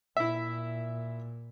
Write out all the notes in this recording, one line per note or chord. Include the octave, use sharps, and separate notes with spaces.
A#2 E4 E5